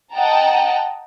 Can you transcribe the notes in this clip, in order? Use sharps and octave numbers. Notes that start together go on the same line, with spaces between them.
D#5 F#5 G5 A5 A#5